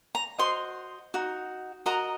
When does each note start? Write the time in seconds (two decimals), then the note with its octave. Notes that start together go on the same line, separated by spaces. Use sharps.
0.15 A#5
0.39 F#4 C5 D#5 C6
1.14 D#4 F#4
1.86 F#4 A#4 D#5 A#5